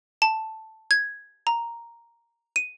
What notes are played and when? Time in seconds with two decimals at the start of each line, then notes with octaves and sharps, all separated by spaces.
0.22 A5
0.91 G#6
1.47 A#5
2.56 D#7